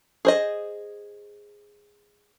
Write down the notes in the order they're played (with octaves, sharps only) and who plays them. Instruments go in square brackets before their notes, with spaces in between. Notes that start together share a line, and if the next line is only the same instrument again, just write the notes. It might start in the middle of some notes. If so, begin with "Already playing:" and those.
[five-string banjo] G#4 C5 D#5